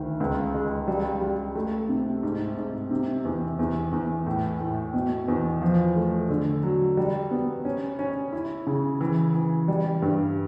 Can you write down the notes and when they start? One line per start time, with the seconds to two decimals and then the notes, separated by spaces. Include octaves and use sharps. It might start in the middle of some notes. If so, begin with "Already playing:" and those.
Already playing: D2 D#3
0.20 C#2
0.54 G#3
0.88 G3
1.21 G3
1.55 A3
1.89 C3
2.23 G#2
2.57 G#2
2.91 C3
3.25 E2
3.59 E2
3.92 E2
4.26 A2
4.60 A2
4.94 B2
5.28 E2
5.62 F3
5.96 A3
6.30 D3
6.63 F#3
6.97 G3
7.31 B3
7.65 C#4
7.99 C#4
8.33 E4
8.67 C#3
9.01 E3
9.35 E3
9.68 G3
10.02 G2